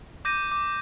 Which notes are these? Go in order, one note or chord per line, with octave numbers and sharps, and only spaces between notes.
D6 G6 A#6 D#7
D6